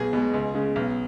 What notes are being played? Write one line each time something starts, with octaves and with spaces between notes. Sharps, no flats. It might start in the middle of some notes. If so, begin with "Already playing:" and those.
Already playing: B1 G#4
B2 G#3
C#2
C#3 G#3
B1